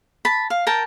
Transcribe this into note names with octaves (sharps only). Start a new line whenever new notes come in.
A5 B5
F5
A#4 G5 A5